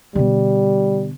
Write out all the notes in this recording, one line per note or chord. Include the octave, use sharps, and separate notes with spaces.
B2 D3 G3